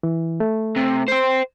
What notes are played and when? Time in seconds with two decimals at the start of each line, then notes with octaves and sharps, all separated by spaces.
0.03 E3
0.40 A3
0.77 C3
1.08 C5 G5